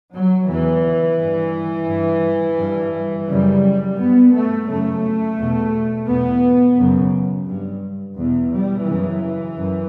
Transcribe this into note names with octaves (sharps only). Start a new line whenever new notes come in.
F#3
E2 C#3 E3
G2
G2
G2
F#2 C#3 G3
G2 B3
A3
F#2 C#3 A3
E2 B2
E2 B2 B3
F#2 C#3
G2
E2 B2
G3
F#2 C#3 E3
F#2